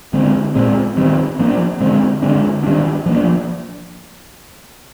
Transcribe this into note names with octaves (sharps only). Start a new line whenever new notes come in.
D3 G#3 C4
A#2 G#3 C4
D#3 G3 C4
F3 A#3 D4
D3 G#3 C4
D3 G#3 D4
D#3 G3 D4
F3 A#3 D4